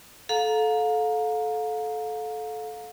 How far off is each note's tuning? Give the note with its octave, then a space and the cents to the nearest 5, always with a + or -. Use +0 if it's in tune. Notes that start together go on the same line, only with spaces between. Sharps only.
A4 -20 F5 +30 A#5 +0